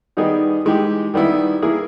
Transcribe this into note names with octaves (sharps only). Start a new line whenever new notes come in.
D#3 G3 B3 D#4 G#4
E3 G#3 D#4 G4
D#3 G3 B3 E4
E3 A#3 E4 G#4